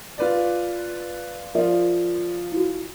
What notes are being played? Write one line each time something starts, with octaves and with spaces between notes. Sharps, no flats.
F4 B4 D5
F3 F4 A#4 D5 E5
E4 F#4